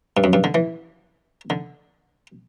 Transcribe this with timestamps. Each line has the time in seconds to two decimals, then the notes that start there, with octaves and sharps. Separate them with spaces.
0.17 G2
0.24 F#2
0.33 G2
0.44 D3
0.55 E3
1.50 D3